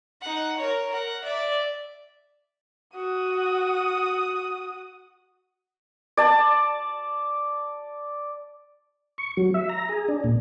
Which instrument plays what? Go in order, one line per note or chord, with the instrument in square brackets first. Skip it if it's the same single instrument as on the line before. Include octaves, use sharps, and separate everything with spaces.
[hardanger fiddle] D#4 F#5
A#4 C#5
A#4 F#5
D5 E5
[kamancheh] F#4 D#6
[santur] D5 A5
[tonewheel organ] C#6
F#3
E5
A#5
G#4
D4
A#2